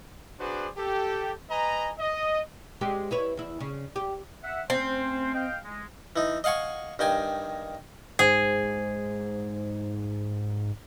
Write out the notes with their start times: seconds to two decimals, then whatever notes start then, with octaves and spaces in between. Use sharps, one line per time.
0.40 D4 F#4 G#4 B4 C5 D5
0.77 G4 A4
1.51 B4 D#5 G#5 A#5
1.99 D#5
2.81 G#3 C4 G4
3.11 E4 B4 C#5
3.37 E2 E4
3.60 C#3
3.96 G4
4.43 E5 F#5
4.70 A3 C4 C#4 C5
5.34 D#5 F5 G5
5.64 G#3
6.16 E3 D#4
6.44 D#5 F5 F#5 G#5 C#6
6.99 G2 D#3 G5 G#5
8.19 G#2 G#4 C5